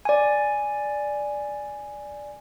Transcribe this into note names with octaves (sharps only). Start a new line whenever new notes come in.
D5 G#5